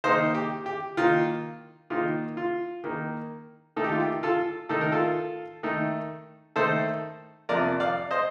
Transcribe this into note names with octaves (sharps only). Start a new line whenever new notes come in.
D#3 A#3 D#4 C5 D#5
G4
G4
D#3 A#3 D#4 F4
D#3 A#3 D#4 F4
F4
D#3 A#3 D#4
D#3 A3 D#4 A4
G4
F4
G4
F4 A4
D#3 A3 D#4 A4
A#4
F4 A4
D#3 A3 D#4
D#3 A3 D#4 A4 C5
F2 C3 F3 A#4 D5
D5 F5
C5 D#5